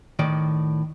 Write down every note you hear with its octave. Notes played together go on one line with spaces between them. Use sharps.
A2 D#3 D5